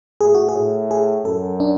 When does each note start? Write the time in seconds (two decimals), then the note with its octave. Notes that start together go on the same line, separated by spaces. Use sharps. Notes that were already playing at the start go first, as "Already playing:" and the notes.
0.21 A2 G#4
0.35 F#4
0.49 G#4
0.56 A2
0.91 G#4
1.25 F#2 A4
1.60 D4